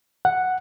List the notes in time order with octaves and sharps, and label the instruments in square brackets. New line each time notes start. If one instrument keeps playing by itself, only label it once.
[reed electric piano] F#5